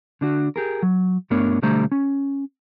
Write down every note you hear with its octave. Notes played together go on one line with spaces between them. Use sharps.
D3 D4 F#4
G4 G#4 A#4
F#3
G2 A3 B3 D4 A#4 C#5
B1 D3 G3 A3 C5 A#5
C#4